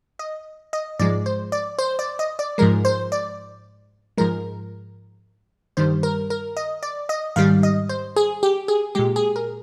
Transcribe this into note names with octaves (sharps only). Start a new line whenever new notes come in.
D#5
D#5
G#2 F3 G#3 D5
C5
D5
C5
D5
D#5
D5
G#2 F3 G#3 A#4
C5
D5
G#2 F3 G#3 A#4
G2 D#3 G3 C5
A#4
A#4
D#5
D5
D#5
G#2 D#3 G3 F5
D#5
C5
G#4
G4
G#4
A#2 G#3 G4
G#4
A#4